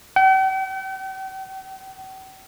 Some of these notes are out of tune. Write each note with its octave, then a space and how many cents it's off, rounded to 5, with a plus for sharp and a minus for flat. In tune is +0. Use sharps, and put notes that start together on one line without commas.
G5 -45